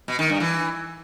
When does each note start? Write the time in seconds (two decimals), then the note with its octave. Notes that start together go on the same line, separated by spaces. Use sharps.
0.08 B2
0.19 D#3
0.30 G2
0.40 E3